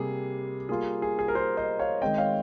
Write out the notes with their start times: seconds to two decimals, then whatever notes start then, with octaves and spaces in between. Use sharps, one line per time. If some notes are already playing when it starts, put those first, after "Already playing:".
Already playing: C3 G3 A#3 G#4
0.69 G3 A#3 F4 G#4
1.02 G#4
1.19 G#4
1.28 A#4
1.35 G#4 C5
1.57 C5 D#5
1.79 C#5 F5
2.02 D#3 G#3 C4 D#4 D#5 G5
2.18 C#5 F5